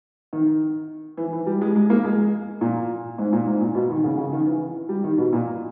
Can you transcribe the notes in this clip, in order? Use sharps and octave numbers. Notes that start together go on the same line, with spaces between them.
D#3
E3
E3
G3
G#3
G#3
A#3
G#3
A#2
G#2
A#2
G#2
A#2
B2
D#3
C#3
C#3
D#3
E3
G3
D#3
B2
A#2